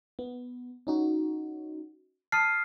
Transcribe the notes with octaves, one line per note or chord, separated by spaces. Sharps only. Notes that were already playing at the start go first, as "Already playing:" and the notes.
B3
C#4 D#4 F#4
A5 D#6 F6 C7